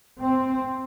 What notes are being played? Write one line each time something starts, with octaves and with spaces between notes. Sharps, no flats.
C4